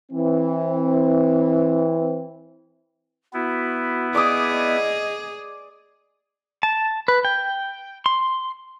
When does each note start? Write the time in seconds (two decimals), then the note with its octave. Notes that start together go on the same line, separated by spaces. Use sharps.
0.12 E3 C4
3.33 B3 E4 F#4
4.15 G#4 D5 D#5 D6 D#6
6.63 A5
7.08 B4
7.25 G5
8.06 C6